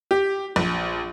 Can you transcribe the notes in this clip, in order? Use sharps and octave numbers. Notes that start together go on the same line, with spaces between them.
G4
A#1